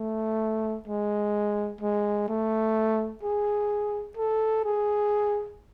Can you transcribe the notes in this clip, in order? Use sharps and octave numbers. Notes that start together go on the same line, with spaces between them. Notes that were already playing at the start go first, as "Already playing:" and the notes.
Already playing: A3
G#3
G#3
A3
G#4
A4
G#4